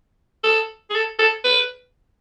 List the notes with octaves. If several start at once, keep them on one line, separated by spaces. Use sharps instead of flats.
A4
G#4
A4
A4
B4